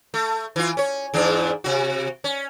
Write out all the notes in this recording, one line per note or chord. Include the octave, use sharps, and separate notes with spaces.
A3
E3 F4
C#4 C#5
E2 G#2 D4
C3 F#4
C#4